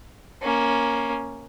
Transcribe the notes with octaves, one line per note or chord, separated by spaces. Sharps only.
A#3 C#4